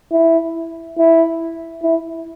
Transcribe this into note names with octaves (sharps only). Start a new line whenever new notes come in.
E4
E4
E4